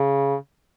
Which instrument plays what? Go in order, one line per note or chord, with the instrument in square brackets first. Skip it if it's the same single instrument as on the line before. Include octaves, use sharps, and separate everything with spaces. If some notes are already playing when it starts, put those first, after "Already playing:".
Already playing: [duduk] C#3